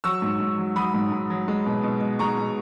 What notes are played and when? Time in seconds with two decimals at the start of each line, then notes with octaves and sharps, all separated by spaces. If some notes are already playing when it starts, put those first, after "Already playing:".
0.04 F#3 C#6 E6
0.22 G#2
0.40 G#2
0.58 F#3
0.76 F#3 B5 D#6
0.94 G#2
1.12 G#2
1.30 F#3
1.48 G#3
1.66 B2
1.83 B2
2.01 G#3
2.19 G#3 A#5 C#6
2.37 B2